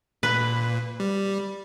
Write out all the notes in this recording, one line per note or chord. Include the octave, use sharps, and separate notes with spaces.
A#2 B4
G3